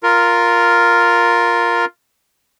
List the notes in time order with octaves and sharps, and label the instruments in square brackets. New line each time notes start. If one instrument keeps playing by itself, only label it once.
[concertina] F4 A#4